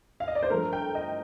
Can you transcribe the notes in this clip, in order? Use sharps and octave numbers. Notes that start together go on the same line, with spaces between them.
F5
D#5
D5
C5
G2 F3 A3 A#4
G5
D#5